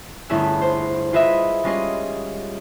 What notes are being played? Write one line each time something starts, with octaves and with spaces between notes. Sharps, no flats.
G1 A3 C#4 E4 G#4 E6
C5
F4 G#4 B4 D#5 E5
G3 G#3 C#4 F4 G#4 D#5